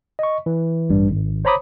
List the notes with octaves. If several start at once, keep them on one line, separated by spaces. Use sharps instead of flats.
D#5 C#6
E3
A1 G2 G3
G#1
C5 C#5 A#5 B5 D6 D#6